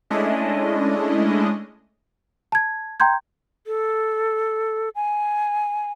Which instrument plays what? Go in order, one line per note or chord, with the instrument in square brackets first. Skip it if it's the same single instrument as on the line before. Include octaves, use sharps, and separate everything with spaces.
[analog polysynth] G#3 A3 C#4 D4 E4 D#5
[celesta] A5 G#6
G5 A#5 C6 G6 G#6
[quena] A4
G#5